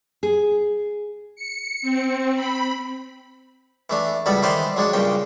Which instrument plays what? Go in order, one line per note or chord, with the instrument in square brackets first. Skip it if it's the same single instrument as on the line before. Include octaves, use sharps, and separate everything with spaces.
[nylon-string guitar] G#4
[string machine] C#7
C4
B5
[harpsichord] E3 A3 D4
C#2 B2 G3 B3 A4 B5
D#3 E3 B4 C5 D5 C6
F#3 G#3 D4 F#4
G2 A#2 C#3 G5